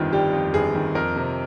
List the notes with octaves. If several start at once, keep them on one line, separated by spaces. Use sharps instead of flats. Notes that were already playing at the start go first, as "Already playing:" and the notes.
Already playing: G1 F2 D#3 G3 F4
G3 G4
F2
G1 G#4
D#3
F2 A#4
C3